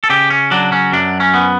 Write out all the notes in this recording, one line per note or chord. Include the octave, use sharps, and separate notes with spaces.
A4
C#3 G4
C#4
F#3 D4
C#4
F#2 D4
C#4
B3